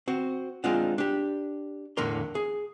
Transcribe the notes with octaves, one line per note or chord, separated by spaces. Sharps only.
C4 F#4
G#3 C4 D4 D#4 F4 F#5
D4 G4
E2 A2 D3 A#3 A#4 C6
G#4